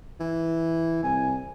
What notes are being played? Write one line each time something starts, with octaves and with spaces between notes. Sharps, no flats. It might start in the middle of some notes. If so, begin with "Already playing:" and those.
E3
C2 G#5